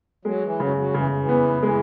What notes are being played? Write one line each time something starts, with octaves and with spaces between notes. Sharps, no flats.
F#3 G#3
E3
C#3 F#3
F#3
C#3 E3
E3
B3
E3 G#3